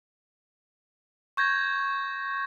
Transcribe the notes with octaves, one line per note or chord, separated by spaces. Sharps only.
C#6 G6 G#6 A#6